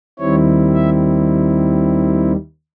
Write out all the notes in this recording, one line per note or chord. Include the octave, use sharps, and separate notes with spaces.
D#2 D#3 G3 C4 E4 C#5
E5